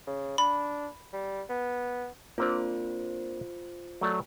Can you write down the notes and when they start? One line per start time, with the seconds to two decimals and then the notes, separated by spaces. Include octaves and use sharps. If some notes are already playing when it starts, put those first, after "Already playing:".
0.07 C#3
0.38 D4 B5
1.13 G3
1.49 B3
2.38 A#3 C4 D4 F4 C5
4.01 F#3 A3 D5